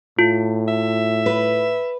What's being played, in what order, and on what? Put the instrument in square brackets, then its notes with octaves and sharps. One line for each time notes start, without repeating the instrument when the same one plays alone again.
[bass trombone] A2 [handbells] F4
[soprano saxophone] E5
[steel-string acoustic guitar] B4